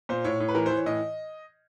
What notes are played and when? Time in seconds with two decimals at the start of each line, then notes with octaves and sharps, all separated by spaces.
0.09 A#2 C5
0.24 A2 C#5
0.40 A2
0.48 B4
0.55 E3 A#4
0.66 E3 C5
0.75 C#5
0.86 A2 D#5